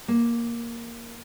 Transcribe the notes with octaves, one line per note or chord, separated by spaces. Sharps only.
A#3